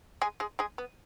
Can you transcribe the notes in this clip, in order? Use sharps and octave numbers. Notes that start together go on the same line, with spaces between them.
G#3 G#4
G#3 G#4
G#3 G#4
B3